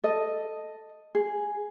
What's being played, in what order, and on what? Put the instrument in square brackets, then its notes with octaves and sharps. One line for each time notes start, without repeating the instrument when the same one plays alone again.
[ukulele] A4 D#5
G#4